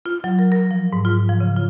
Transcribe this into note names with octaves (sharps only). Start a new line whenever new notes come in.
F4
F#3
A#4
A#4
F3
G#2
F4
F3
C#3
F4